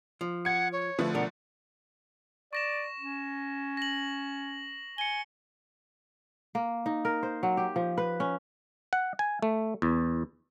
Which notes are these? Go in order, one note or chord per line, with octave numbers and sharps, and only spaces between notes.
F3
F#5 G#6 C#7
C#5
D3 F3 A3 B4
B2 D4 A#4 F#5
D5 C#6 A#6 E7
C#4
A#6 F#7
G#5 C#7 G7
A#3
D#4
A#4
C5
F#3
G4
F3
B4
C#4
F#5
G#5
A3
E2